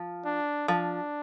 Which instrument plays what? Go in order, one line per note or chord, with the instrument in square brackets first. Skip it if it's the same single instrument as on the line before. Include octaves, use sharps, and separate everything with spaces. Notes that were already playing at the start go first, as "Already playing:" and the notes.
Already playing: [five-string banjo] F3
[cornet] D4
[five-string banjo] F3 [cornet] D4